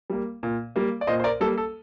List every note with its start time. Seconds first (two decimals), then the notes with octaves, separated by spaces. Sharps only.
0.10 G3 A#3
0.43 A#2
0.76 G3 A#3
1.01 D5
1.07 A#2 C5 D#5
1.20 C5
1.24 A#4 D5
1.41 G3 A#3 A4
1.58 A4